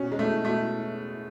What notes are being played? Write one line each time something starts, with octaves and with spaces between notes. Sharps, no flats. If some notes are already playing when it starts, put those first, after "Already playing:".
Already playing: B2 C#4
G#3
B2 A3
B2 A3